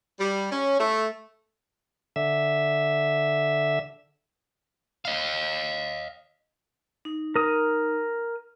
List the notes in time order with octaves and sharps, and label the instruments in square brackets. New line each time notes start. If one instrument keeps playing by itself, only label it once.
[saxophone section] G3
C#4
A3
[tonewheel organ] D3 E5
[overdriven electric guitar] D#5 F5
[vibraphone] D#4
[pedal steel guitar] A#4 D#6